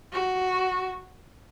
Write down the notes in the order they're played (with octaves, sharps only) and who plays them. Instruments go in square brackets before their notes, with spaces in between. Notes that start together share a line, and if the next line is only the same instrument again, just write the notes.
[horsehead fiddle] F#4